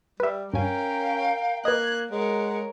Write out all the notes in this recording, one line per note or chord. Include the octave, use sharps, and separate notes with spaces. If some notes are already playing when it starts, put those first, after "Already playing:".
G3 B4 E5
G2 C#4 A#4 F5 G5 G#5
A#3 B4 D#5 F#6 G#6
G#3 A#4 C#5 F#5